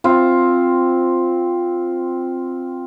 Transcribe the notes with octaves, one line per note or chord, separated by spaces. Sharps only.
C4 F4